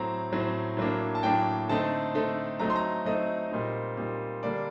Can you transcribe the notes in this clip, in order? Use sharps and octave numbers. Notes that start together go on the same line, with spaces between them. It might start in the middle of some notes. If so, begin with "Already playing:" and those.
Already playing: A2 F#3 C4 A#5
A2 F#3 C4
A2 F#3 A#3 D4
A5
A2 F#3 A#3 D4 G5
D3 A3 C4 D#4 A5
D3 A3 C4 D#4
F#3 A3 C4 D#4 A#5
C6
A#5
F#3 A3 C4 D#4 D#5
A#2 G3 C4 D#4
A#2 G3 C4 D#4
D3 G3 A#3 D4 D5